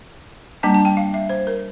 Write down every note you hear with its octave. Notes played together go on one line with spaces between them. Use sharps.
G3 A#3 D4 A5
A5
G5
F5
E5
C5
A#4